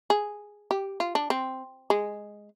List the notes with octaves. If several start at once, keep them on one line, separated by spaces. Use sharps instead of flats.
G#4
G4
F4
D4
C4
G#3